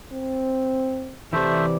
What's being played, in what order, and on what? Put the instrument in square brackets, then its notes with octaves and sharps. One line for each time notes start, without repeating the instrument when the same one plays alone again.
[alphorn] C4
[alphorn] C3 [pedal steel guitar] E3 D5 [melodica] A3 C5 E5